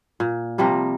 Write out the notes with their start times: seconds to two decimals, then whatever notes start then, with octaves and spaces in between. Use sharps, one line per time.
0.20 A#2
0.58 C3 F3 G3 A#3